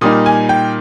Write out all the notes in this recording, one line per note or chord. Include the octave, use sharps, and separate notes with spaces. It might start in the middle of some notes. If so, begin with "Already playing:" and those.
A#2 G3 A#3 D#4 D#6
G#5
G5